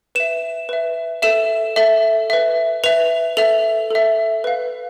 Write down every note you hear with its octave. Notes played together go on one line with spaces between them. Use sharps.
B4 E5 E7
B4 E5
A4 E5 E7
A4 E5
B4 E5
B4 E5 F7
A4 E5 F7
A4 E5
B4 F5